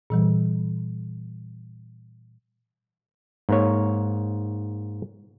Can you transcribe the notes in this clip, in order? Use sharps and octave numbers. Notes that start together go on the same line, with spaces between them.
A#2 E3 G3
G#2 A#3 C#5